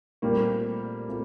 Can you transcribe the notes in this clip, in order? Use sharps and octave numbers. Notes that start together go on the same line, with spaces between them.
A#2 G3 A3 A#3 C4 F4
A3 C4 F4